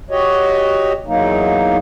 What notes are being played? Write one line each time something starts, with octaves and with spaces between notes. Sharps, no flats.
F#4 G4 C#5 D#5
E2 F#3 A#3 D#4